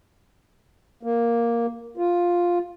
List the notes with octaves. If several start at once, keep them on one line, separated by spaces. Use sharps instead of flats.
A#3
F4